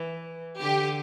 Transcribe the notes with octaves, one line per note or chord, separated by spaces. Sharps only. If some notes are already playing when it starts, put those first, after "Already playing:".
Already playing: E3
D3 G4